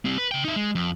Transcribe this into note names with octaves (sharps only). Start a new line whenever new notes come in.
G3 C4
B4
C#3 G5
D#4 E5
G#3
F2